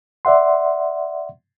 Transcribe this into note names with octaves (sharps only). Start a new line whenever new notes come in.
D5 E5 F#5 C6